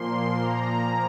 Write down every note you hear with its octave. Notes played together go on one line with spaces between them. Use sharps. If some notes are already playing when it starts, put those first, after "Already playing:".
Already playing: A#2 F3 A#3 C6
A#5